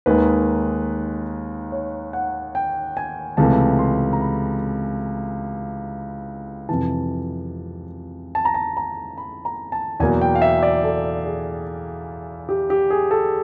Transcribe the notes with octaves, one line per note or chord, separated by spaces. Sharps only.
D#2 D#3 G#3 B4
C#5
F#5
G5
G#5
C#2 C3 E3 A3 A5
C6
A#5
B5
F2 C3 E3 A5
A5
A#5
A5
A#5
B5
A#5
A5
E2 B2 F#3 A#3 G#5
G5
F5
E5
D5
A4
G#4
G4
G4
G#4
A4